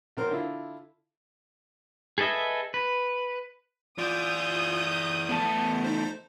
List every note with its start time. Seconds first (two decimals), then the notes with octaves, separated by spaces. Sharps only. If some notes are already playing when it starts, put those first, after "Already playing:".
0.17 B1 C4 A#4 C6
0.31 D3 E4 F4
2.18 G#4 A4 B4 D#5 E5
2.74 B4
3.98 E3 F4 D5 D#6 G6
5.29 E2 A3 B3 A5
5.84 D#4 C5